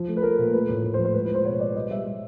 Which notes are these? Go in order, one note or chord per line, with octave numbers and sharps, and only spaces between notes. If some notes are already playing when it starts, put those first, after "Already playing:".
Already playing: F3
A3
B4
A3 A#4
A#2
A3 B4
A2
A2 B4
C5
F3
C5
G#3 B4
B4
G#3 C5
B2 C#5
G#3 D5
G3 D#5
G3 E5
G3